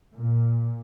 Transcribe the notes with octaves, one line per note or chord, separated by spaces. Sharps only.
A#2